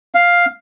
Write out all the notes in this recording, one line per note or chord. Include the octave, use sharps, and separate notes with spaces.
F5